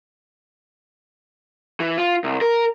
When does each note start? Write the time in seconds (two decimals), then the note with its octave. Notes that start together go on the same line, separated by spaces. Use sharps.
1.80 E3
1.98 F4
2.24 C2
2.41 A#4